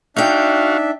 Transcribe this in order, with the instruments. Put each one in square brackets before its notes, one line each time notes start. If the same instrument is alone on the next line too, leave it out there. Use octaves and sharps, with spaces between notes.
[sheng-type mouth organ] D4 E5 [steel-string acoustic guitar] D#4 G5 [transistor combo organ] F#4 F5